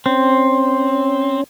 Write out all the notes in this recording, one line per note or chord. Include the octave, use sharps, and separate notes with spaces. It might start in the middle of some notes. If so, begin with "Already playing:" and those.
C4 C#4